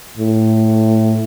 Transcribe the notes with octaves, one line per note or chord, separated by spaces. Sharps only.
A2